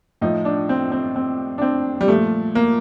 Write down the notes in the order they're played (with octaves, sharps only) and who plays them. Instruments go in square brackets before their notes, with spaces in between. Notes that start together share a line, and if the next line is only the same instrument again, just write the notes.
[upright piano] A2 F3 D#4
D4
C4
C4
C4
D4
C4
G3
A#2 F3 A3
A#3